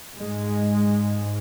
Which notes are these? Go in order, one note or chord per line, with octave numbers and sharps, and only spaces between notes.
G#2 G#3